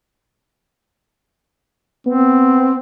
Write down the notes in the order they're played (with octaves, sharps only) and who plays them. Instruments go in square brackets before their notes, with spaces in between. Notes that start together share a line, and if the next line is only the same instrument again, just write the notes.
[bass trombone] B3 [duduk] C4